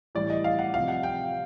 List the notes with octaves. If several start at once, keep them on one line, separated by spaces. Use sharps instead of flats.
A2 E3 G3 D5
D#5
F5
F#5
C3 F3 F5
F#5
G5